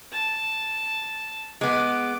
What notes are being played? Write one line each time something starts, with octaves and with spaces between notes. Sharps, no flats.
A5
G#3 B3 D6